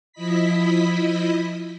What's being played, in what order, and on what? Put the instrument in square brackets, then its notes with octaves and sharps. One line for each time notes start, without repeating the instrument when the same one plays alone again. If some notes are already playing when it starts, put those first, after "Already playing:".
[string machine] F3 E4 D#5 B5 B6